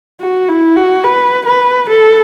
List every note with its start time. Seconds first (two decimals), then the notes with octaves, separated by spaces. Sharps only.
0.21 F#4
0.49 E4
0.76 F#4
1.04 B4
1.46 B4
1.89 A4